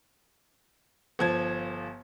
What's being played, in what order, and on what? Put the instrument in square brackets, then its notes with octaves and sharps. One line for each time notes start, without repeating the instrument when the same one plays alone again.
[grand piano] G1 F3 G#6